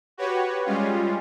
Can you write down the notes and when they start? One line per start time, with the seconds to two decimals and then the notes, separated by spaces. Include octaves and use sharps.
0.17 F#4 G4 B4 C#5
0.65 G3 G#3 C#4 F4